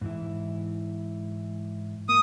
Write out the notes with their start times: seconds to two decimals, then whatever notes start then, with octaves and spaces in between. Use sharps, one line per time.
0.01 G#2 E3 E4
2.09 A#3 D#6